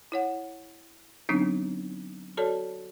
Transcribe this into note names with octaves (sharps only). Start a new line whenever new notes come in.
E4 C#5 F#5
D3 F#3 B3 C4 D4 D#4
F#4 A4 C#5 D5 A5